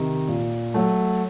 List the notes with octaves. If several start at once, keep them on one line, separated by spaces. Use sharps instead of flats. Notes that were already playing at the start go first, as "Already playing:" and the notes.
Already playing: C3 D#3
A#2
F#3 A3